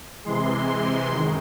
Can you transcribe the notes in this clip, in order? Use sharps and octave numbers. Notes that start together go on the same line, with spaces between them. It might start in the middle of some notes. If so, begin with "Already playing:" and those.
C3 E3 G#3 C6
C6
F#2 D#3 G#3